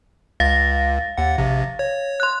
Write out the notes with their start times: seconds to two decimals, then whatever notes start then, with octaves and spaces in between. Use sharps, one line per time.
0.40 C#2 F5 A6 A#6
1.18 D#2 F#5
1.38 A#1 C3
1.79 C#5
2.20 C6 F#6